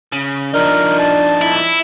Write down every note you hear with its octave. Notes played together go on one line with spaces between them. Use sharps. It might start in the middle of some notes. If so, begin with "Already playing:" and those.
C#3
F3 D4 D#4 A#4
A5
E4